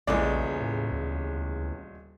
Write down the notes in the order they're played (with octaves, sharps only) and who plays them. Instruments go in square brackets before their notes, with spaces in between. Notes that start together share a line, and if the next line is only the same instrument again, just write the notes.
[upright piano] D#1 G#3 D5 [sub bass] A#1 [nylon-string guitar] E2 C#3
[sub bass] A2
D2